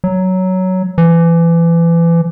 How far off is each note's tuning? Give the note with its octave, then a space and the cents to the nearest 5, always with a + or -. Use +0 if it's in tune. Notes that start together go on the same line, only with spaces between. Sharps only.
F#3 +10
E3 +30